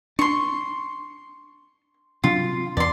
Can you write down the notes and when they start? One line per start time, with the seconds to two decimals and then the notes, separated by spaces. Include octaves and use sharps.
0.19 D4 C6 C#6
2.24 C3 F#3 D4 F4
2.77 E2 D5 C6